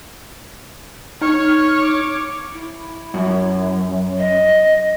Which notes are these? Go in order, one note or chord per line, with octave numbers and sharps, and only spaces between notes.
D#4 C#5 F6
D6
E4
F#2
D#5